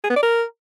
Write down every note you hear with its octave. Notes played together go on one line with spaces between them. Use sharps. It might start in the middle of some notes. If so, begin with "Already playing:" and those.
G#4
B3
D5
A#4